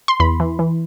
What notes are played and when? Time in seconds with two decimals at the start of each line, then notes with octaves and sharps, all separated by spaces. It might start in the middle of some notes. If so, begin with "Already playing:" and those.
0.08 C6
0.20 E2 B5
0.40 E3
0.59 E3